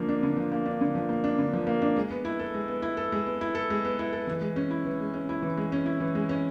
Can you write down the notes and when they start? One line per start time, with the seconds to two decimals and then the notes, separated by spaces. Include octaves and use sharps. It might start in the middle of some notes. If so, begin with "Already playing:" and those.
Already playing: D3 F3 A#3
0.08 D4
0.23 D3
0.37 F3
0.52 A#3
0.65 D4
0.81 D3
0.95 F3
1.09 A#3
1.24 D4
1.39 D3
1.53 F3
1.67 A#3
1.82 D4
1.96 G#3
2.10 B3
2.25 E4
2.39 A4
2.54 G#3
2.68 B3
2.82 E4
2.97 A4
3.12 G#3
3.26 B3
3.41 E4
3.55 A4
3.70 G#3
3.85 B3
3.99 E4
4.13 A4
4.27 E3
4.41 G#3
4.56 C#4
4.71 E4
4.85 E3
5.00 G#3
5.14 C#4
5.29 E4
5.42 E3
5.57 G#3
5.72 C#4
5.86 E4
6.00 E3
6.15 G#3
6.29 C#4